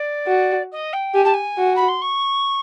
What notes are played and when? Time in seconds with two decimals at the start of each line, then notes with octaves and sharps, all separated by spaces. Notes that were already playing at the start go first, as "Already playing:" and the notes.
Already playing: D5
0.27 F#4
0.72 D#5
0.93 G5
1.14 G4 G#5
1.24 A5
1.34 G#5
1.58 F#4
1.76 B5
1.88 C6
2.01 C#6